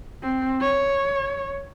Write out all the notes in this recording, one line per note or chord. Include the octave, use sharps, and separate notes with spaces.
C4
C#5